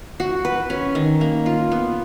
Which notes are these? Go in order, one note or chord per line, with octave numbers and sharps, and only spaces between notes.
F#4
B4
C#4
D#3
A#3
F4
B3